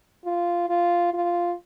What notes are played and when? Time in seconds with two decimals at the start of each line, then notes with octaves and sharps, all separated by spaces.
0.25 F4
0.69 F4
1.14 F4